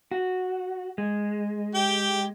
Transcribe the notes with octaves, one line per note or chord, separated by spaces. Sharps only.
F#4
G#3
G4 G5